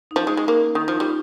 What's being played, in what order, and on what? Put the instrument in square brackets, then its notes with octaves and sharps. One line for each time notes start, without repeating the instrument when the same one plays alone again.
[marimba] D#4
[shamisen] F3 [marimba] C#4
[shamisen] G#3 [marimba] D#4
[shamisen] G#3 [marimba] C#4
[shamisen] A#3
D#3
[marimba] D#4
[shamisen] F3 [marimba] F4
[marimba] D#4
[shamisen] G3
[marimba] C#4